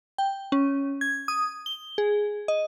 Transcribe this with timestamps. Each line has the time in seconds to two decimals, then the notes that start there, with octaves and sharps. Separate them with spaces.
0.18 G5
0.52 C#4
1.01 G#6
1.28 D#6
1.66 G7
1.98 G#4
2.48 D#5